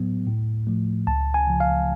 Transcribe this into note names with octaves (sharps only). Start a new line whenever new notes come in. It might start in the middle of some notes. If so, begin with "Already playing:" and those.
Already playing: A2 F#3 B3
A2
F3 A3
C#2 A5
G#5
C#3 F3
F5